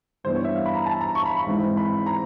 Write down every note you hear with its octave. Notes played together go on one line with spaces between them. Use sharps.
G2 E3 G3 B3 D4 C5
C#5
E5
F5
B5
A#5
A5
A#5
C#6
B5
B5
G#1 G#2 E3 G#3 C4
B5
A#5